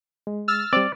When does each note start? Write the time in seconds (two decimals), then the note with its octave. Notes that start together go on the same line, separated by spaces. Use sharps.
0.27 G#3
0.48 E6 F6 A6
0.73 G3 C4 D5